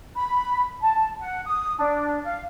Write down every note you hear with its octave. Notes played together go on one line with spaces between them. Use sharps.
B5
A5
F#5
D#6
D4
F5